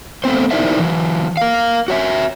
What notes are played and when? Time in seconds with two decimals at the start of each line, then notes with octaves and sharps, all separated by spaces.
0.24 A3 B3 C4 C5
0.51 D#4 E4 A#4 C5 D5 E5
0.79 E3 F#3
1.37 A#4 F5
1.88 F#4 C#5 E5